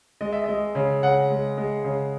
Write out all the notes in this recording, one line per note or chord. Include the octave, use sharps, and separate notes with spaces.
G#3 D#5
E5
G#3 D#5
C#3
C#3 F#5
G#3
G#3
C#3